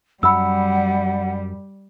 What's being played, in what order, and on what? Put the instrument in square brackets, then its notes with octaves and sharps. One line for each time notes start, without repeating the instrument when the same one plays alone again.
[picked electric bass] F#2 [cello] G3 [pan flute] F#5 [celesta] B5 E6